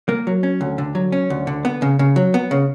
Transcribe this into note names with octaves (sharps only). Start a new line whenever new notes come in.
A#3
F#3
C#4
D2
D3
F#3
C#4
D2
D3
B3
C#3
C#3
F#3
B3
C#3